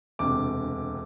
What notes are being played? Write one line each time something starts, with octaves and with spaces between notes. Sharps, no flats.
E1 D2 C3 D6